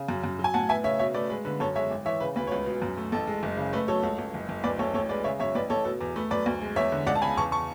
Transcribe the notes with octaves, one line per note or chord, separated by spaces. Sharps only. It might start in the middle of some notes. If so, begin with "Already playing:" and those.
Already playing: C#3
F#2
F#2
F#3
G#5
A2 F#5 A5
B3 E5 G#5
C#3 C#5 E5
B2 C#5 E5
A3 B4 D5
G#3 B4
D3 B4
F#2 A4 C#5
G#3 C#5 E5
G#1
E3 C#5 E5
C#3 B4
D2 B4
C#5
C#2 B4
B2
F#2
A3
A1 A4
G#3
F#1
C#3
A3 B4
F#3 A4 C#5
C#2
C#2
F#1
F#1
D2 B4 D5
D2 A4 C#5
A1 A4 C#5
G#3 B4 D5
C#3 C#5 E5
F#2 C#5 E5
A1 B4 D5
A1 A4 C#5
B2 A4
E2
A3 B4
F#2 B4 D5
D2
G#3
E2 C#5 E5
D3
C#2 D5 F#5
A5
C#3 G#5 B5
E2 A5 C#6
A5 C#6